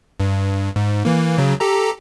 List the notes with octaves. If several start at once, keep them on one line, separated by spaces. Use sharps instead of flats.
G2
G#2
E3 A#3
C#3 F#3
G4 A4 A#5